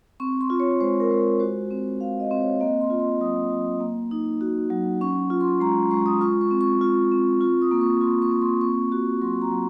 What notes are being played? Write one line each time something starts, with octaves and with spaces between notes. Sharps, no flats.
C4 C#6
C6
F4
C#5
G#3 C5
A#4
G#3
A#4
F#4 C5
C4
F#4 F5
D#5
C4
C#5
A#3 D#5
C6
F4
C6
F#3 D#6
F#3
A#3
D#4
F#4
F#3
C#4 C#6
F4
C6
G#3 A#5
G#3 C#6
D#6
F4 C#6
C#6
C4
C#6
F4
C4
F4 C#6
D#6
A#3
C#6
F4 C6
C#6
A#3
C6
C4 C#6
F#4 C#6
F#3 C6
A#5
F#3